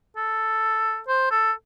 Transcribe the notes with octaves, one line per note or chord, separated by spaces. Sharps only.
A4
C5
A4